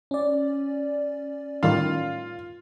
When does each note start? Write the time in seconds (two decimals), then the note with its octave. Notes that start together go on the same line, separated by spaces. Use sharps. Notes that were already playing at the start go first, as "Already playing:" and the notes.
0.11 C#4 D5
1.63 A2 D#3 G3 F4